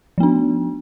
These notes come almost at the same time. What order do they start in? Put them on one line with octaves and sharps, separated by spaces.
F3 B3 D4